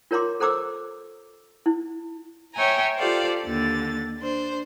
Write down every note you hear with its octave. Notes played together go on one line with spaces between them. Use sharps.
F4 A#4 C#5 A#5 C6 D6
A4 C5 A#5 D6 E6
E4
C#5 E5 G5 G#5 A#5
F4 G4 A4 C5 D5 F5
D#2 D3 A6
D4 C5